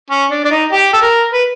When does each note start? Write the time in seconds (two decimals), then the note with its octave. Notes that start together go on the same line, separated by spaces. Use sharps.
0.10 C#4
0.31 D4
0.45 D4
0.51 D#4
0.72 G4
0.94 A4
1.02 A#4
1.33 B4